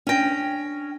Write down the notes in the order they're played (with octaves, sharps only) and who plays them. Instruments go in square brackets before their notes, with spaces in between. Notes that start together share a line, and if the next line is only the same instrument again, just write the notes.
[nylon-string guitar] C#4 G5 [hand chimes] D4 A#6